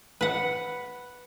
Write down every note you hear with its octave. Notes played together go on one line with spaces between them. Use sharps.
B4 F#5